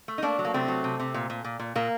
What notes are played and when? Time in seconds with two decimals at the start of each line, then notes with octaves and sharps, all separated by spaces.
0.08 A3
0.18 D#4
0.22 A3 A#3 D4
0.39 F#3
0.45 A#3
0.54 C3 A3 C4
0.68 F#3
0.84 C3
1.00 C3
1.14 A#2
1.30 A#2
1.44 A#2
1.59 A#2
1.75 A#2 A#3